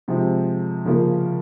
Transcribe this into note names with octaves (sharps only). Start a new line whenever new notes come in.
C3 F3 G#3 C4
C#3 F3 A#3 F4